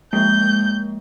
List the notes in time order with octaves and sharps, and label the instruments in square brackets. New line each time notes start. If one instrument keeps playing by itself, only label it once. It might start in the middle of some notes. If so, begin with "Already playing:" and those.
[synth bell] F3 G#3 A#3 [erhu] G6